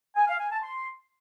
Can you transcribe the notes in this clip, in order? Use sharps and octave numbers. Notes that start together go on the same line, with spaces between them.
G#5
F5
G#5
A5
C6